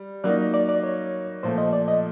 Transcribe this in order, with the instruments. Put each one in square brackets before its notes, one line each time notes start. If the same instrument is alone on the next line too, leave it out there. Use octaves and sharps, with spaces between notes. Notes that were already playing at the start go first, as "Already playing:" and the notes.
Already playing: [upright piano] G3
[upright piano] F#3 A#3 D#4 [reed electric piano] D5
[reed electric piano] D5
D5
C#5
[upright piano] A#2 F3 A3 [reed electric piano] C5
[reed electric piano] D#5
D5
D#5